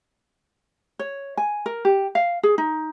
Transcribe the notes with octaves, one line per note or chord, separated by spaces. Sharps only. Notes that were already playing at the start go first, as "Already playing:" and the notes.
C#5
G#5
A#4
G4
F5
G#4
D#4